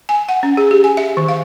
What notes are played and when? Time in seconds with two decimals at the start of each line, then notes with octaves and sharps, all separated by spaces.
0.09 G#5
0.29 F#5
0.43 C#4
0.57 G#4
0.71 G4
0.84 G#5
0.97 E5
1.17 D#3
1.28 F5